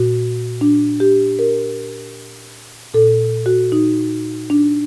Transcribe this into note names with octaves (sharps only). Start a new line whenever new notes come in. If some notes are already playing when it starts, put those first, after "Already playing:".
Already playing: A#2 F#4
D4
G4
A#4
A#2 A4
F#4
D#4
D4